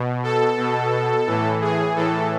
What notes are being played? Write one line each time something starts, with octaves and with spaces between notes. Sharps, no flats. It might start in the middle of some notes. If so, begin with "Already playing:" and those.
Already playing: B2
A4
B2
A2 E3
G#4
A2 E3 A4